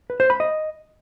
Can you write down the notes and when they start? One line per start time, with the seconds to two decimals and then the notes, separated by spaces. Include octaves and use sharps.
0.10 B4
0.20 C5
0.30 B5
0.40 D#5